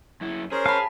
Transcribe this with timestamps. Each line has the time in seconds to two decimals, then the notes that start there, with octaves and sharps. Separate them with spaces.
0.21 F#2 E4
0.52 C#4 G#4 A#4 C5
0.66 F5 A5 B5